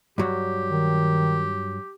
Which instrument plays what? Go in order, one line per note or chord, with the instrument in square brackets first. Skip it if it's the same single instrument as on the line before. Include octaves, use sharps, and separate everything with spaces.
[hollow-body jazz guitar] G2 F#3 [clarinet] G4
[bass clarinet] D#3